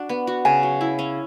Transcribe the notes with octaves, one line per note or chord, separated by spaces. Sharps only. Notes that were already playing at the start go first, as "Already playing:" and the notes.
Already playing: D4 F#4
B3
F#4
C#3 G#5
F#3
E4
C#4